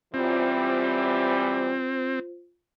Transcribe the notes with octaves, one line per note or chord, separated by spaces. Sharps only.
F#2 E3 G3 C4 F4 C5